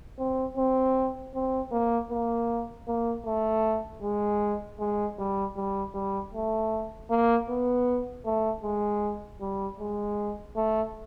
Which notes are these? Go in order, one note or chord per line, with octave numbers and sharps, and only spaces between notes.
C4
C4
C4
A#3
A#3
A#3
A3
G#3
G#3
G3
G3
G3
A3
A#3
B3
A3
G#3
G3
G#3
A3